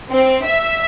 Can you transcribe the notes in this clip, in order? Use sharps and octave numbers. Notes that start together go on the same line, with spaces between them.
C4
E5